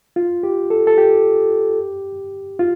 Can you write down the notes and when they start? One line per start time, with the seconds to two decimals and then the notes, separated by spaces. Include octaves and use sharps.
0.16 F4
0.43 G4
0.70 A4
0.87 A4
0.98 G4
2.59 F4